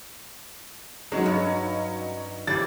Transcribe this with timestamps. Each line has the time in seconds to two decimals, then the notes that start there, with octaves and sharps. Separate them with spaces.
1.12 F#3 G#3 C#4 D#4
1.26 G2
2.47 F2 E3 G3 A6